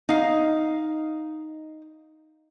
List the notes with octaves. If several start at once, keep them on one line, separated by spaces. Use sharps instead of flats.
D#4 F5